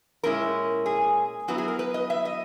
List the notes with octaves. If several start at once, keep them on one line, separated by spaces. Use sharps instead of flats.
A#2 G#3 C#4 E4 A#4
G#4
F#3 B3 E4 F#4
G#4
A#4
B4
D#5
E5
D#5